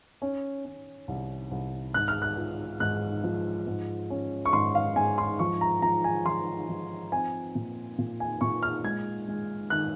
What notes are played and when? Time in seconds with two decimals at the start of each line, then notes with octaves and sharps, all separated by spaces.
0.22 C#4
0.65 C#4
1.08 C2
1.51 C2
1.94 G#2 F#6
2.08 F6
2.22 F#6
2.37 F4
2.80 G#2 F#6
3.24 F3
3.67 G#2
4.10 C#4
4.45 C#6
4.53 G#2 C6
4.75 F5
4.96 G#2 G#5
5.18 C6
5.39 F3 C#6
5.61 A#5
5.82 F3 A#5
6.04 G#5
6.26 F3 C6
6.69 F3
7.12 C4 G#5
7.55 A#2
7.98 A#2
8.20 G#5
8.41 A#2 C#6
8.63 F6
8.84 G#3 G#6
9.28 G#3
9.70 D#3 F#6